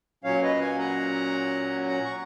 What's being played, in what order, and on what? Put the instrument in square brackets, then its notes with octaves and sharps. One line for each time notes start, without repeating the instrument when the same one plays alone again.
[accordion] A#2 F#3 C#4 C#5 F5
B4 D#5
F5 G#5
F#5 A#5
F#5 A#5
C#6